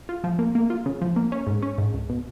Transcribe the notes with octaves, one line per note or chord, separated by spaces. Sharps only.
F4
F3
A#3
A#3
F4
C#3
F3
A#3
C#4
G#2
C#4
G#2
C#2
B2